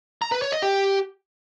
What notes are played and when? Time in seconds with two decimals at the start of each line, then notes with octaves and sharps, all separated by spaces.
0.22 A#5
0.32 B4
0.42 C#5
0.52 D#5
0.62 G4